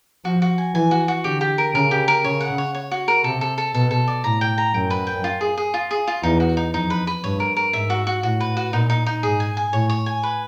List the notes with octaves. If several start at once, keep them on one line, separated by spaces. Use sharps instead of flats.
F3 F#4
F#4
G#5
E3 G#5
F#4
F#4
D3 G4
G4
A#4
C#3 A#4
G4
A#4
C#3 C#5
F#5
C#5
C#5
F#4
A#4
C3 A4
A4
A4
B2 A4
A4
D5
A2 A#5
G5
A#5
F#2 G5
B4
G5
F4
G#4
G#4
F4
G#4
F4
E2 D#4
F#4
D#4
F2 D#4
B4
B4
G2 C#5
A#4
A#4
G#2 E5
F#4
F#4
A2 F#4
B4
F#4
A#2 D#4
D#4
D#4
G#2 G#4
G#5
G#5
A2 C#5
C#5
G#5
B4